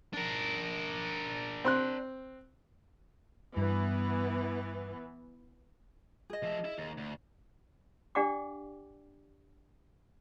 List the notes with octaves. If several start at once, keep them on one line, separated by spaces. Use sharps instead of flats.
D4 A#4
C4 C6 F#6
G2 E3 B3
G#4 D#5
F3 E5
E4 E5
D#2
D2
D4 G4 D5 F#5 G5 D6